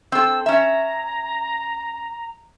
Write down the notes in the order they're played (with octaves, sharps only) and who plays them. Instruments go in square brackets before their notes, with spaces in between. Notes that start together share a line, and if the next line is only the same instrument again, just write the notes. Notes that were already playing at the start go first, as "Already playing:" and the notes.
[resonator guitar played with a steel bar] C4 A4 [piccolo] E6
[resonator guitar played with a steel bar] C#4 E5 [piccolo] A#5